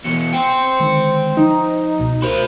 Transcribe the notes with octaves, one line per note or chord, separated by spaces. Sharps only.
E2 B2 C#7
C5 G5
D3 D#3 G#3
F3 D#4
C#2 B2
F#4 A#4 C5 B5